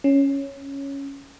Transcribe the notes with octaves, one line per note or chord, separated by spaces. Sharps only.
C#4